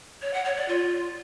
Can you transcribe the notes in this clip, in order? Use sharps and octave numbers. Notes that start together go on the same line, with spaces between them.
C#5
F#5
C#5
D5
F4